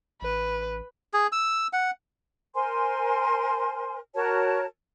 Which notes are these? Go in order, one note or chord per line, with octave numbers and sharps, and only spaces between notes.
A1 B4
G#4
E6
F#5
A#4 C5 G#5 C6
F#4 A#4 C#5 A5